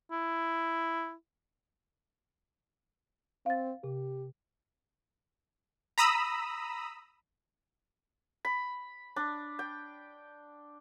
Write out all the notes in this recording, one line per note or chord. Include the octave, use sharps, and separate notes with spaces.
E4
C4 F5 A6
C3 G4
A#5 B5 D#6 E6
B5
D4
G5